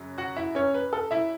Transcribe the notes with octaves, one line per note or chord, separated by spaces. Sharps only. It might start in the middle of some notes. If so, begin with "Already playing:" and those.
Already playing: F#2 C#3 F#3
F#4 F#5
E4 E5
C#4 C#5
B4
A4
E4 E5